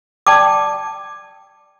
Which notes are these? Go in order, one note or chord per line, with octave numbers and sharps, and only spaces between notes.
D5 G5 A5 D6